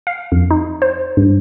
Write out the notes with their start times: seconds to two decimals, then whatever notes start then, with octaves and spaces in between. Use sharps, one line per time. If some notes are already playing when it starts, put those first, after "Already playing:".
0.07 F5
0.32 F2
0.51 D#4
0.82 C5
1.17 G2